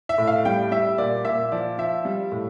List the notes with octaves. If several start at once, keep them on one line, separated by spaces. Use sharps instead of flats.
E5
A2
F5
G3 G5
G3 E5
A#2 D5
A#2 E5
F3 D5
F3 E5
G3
A2